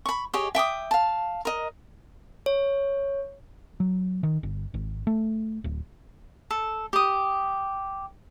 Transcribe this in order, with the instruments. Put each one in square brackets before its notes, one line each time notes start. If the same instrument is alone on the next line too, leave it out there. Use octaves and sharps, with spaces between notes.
[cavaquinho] B5 C#6
G4 G#4 C#5 D#5
E5 G5 D6 D#6
F5 A5
A#4 D#5
[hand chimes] C#5
[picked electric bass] F#3
D#3
G1
G#1
A3
D1
[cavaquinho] A4
G4 D#6